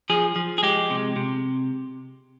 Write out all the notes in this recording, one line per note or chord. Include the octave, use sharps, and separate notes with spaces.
F3 G#4
F3
G#4
G#3 G4
C3
C3